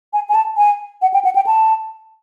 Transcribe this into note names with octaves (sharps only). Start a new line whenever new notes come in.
G#5
G#5
A5
G#5
F#5
G5
F#5
G5
A5